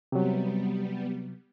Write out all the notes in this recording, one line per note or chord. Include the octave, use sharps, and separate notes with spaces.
C3 F#3 G3 B3